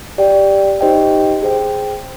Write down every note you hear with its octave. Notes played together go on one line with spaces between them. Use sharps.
G4 D5 G5
D#4 G4 C5 D#5 G5
G#4 C5 G5